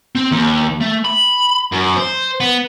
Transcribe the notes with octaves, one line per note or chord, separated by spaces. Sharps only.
C4
D#2
A3
B5
F#2
C5
B3